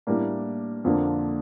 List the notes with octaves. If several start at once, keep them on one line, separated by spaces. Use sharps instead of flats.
A2 G3 A#3 D4
F2 D3 F3 A#3 D4